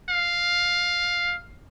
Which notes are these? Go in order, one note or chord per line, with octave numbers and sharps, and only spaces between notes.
F5